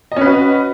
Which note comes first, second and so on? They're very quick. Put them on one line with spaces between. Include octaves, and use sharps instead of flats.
D#5 C#4 B4 F#4